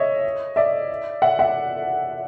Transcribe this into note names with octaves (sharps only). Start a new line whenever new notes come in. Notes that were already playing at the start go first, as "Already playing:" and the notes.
Already playing: C#5 D#5 E5
D5 E5
E5 F#5
E5 F#5